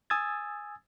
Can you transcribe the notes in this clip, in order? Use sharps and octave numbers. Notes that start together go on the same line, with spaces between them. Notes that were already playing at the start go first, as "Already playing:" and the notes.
G#5 D#6 E6 G#6 A6